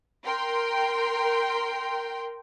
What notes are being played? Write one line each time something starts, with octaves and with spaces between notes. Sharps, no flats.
A#4 G5 C6